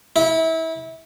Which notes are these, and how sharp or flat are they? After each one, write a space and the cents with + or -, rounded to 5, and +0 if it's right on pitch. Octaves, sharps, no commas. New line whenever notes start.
E4 -25